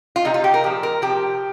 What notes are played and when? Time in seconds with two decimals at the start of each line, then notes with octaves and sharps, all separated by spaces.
0.16 F4
0.25 C3 G3 D#4
0.34 F4
0.44 G4
0.54 A#4
0.63 A#2 F3 G4
0.83 A#4
1.02 C3 F3 G4